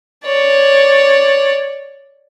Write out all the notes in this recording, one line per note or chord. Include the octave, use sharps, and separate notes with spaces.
C#5 D5